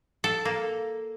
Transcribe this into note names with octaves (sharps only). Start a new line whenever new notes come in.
A4
A#3